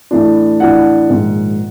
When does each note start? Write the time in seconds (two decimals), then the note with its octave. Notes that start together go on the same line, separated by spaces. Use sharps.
0.11 A2 E3 A3 D4
0.60 A2 E3 A3 D4 F#5
1.10 A#1 G#2 D#3